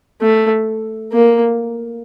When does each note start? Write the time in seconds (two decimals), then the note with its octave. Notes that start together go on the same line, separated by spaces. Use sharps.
0.21 A3
1.12 A#3